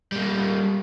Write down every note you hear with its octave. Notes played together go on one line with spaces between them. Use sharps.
G3 A#3